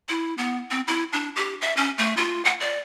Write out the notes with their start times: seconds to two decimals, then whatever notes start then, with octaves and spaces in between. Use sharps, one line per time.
0.08 E4
0.38 B3
0.71 C4
0.87 E4
1.12 D4
1.36 G4
1.61 E5
1.77 C#4
1.98 A3
2.17 F4
2.45 F#5
2.60 D5